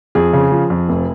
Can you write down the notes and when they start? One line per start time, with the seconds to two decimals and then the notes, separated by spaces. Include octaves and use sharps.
0.15 F2 G#4
0.33 C#3
0.52 F3
0.70 F2
0.89 F1